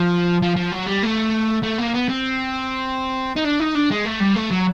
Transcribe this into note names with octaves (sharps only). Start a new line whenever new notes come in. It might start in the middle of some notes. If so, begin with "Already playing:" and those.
Already playing: F3
F3
F3
F#3
G3
A3
A3
A#3
B3
C4
D#4
D4
D#4
D4
G#3
A3
G3
A3
F#3